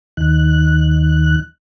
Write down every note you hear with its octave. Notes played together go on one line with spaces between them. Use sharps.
D#2 D#3 F#6